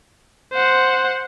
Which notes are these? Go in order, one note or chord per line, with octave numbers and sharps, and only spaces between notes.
C5 F#5